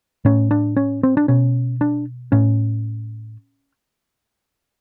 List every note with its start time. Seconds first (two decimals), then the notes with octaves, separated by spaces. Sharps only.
0.25 A2 C#4
0.51 D4
0.77 C#4
1.03 C4
1.17 D4
1.28 B2 C#4
1.81 D4
2.32 A2 C#4